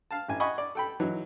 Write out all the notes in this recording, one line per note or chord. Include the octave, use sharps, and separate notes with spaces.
F5 A5
A1 G#5
D#5 F#5 G#5 B5 C#6
D5
A4 G5 B5
E3 F#3 D#4